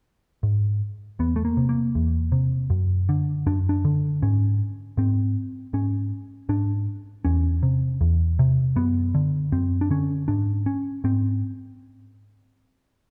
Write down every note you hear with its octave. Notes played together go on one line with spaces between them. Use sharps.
G#2
E2 B3
A3
A#3
C3
A#3
E2
C3
F#2
D3
F#2 D4
D4
D3
G#2 C#4
G#2 C4
G#2 C#4
G#2 D4
E2 C#4
C3
E2
C3
F#2 B3
D3
F#2 C4
D4
D3 C#4
G#2 D4
C#4
G#2 C4